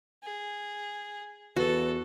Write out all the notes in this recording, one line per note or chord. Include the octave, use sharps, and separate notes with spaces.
G#4
E2 F#4 A4 B4